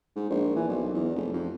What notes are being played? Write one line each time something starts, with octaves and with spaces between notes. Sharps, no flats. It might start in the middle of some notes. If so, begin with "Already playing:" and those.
G#2
A#1
E3
B1
E2
F1
F2